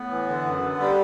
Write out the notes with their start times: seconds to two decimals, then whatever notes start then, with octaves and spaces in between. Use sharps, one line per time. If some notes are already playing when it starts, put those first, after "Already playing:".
Already playing: A2 B3
0.11 E3
0.28 D3
0.46 F#2
0.63 D3
0.80 G3